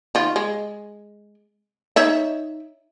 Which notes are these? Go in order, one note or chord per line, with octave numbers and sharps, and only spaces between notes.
D#3 F4
G#3
D#4 C#5 E5